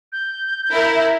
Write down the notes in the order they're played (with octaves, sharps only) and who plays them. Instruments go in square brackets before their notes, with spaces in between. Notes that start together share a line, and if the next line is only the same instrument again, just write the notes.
[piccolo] G6
[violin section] E4 A#4 [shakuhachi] E5